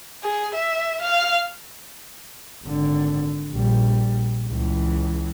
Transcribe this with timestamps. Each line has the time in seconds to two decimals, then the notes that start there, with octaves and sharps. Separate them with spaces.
0.24 G#4
0.54 E5
1.02 F5
2.64 G#1 D3
3.52 A#1 G3
4.49 C#2 E3